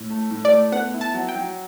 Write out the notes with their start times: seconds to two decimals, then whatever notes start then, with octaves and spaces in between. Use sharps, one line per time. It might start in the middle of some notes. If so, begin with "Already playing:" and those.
Already playing: A2
0.10 A3
0.30 A2
0.45 D5
0.51 A3
0.72 B3 F#5
0.94 E4
1.01 A5
1.14 F#3
1.29 G5
1.35 F#3